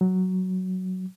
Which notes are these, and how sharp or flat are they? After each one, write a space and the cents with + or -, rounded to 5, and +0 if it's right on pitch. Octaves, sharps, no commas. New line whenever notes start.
F#3 +5